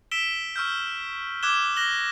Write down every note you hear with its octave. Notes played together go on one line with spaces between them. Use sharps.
E6 B6 D7 E7 G7
C#6 E6 F6 G6
D6 E6 F#6 G#6 E7 G7
F6 F#6 A#6 F#7 G7